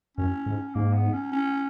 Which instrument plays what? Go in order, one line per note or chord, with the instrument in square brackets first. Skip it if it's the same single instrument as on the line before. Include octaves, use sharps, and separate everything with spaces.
[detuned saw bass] F#2 [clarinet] C#4
[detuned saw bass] G#2
[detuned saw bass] G#2 [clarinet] A#3
[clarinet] B3
C#4
C#4